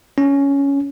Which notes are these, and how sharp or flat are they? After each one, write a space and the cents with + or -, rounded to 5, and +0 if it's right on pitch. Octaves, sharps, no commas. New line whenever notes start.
C#4 +10